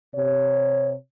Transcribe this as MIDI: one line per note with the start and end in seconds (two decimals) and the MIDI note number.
0.15 0.93 48
0.15 0.93 73